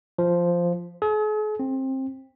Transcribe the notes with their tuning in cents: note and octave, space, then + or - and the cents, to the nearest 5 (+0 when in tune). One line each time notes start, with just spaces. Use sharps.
F3 -5
G#4 +45
C4 +20